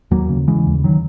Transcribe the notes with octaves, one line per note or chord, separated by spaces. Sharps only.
D#2 F#3 A#3
C#3
C#3 E3 G#3
D#2
D#3 F#3